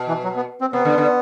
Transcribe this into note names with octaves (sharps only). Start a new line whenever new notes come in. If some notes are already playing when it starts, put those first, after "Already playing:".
Already playing: B2
E3
F#3
B3
C4
C3 B3
D3
D3